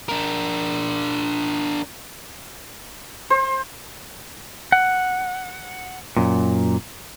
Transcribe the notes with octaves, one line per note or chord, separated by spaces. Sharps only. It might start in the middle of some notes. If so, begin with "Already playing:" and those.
D4 A#4
C5
F#5
F#2 A#2